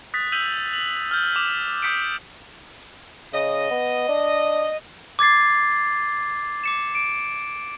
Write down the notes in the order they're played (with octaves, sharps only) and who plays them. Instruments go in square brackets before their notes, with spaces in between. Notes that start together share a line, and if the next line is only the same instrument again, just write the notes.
[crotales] D#6 F#6 A6 B6
E6 G6 B6 D#7 F7 F#7
F7 F#7
F6 G6
D6 E7 F7
D6 D#6 G6 B6 C#7 D7
[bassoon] C#3 [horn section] D#5
[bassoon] B3
D4
[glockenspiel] D6 G#6 A6 C7
D6 C#7 E7
D7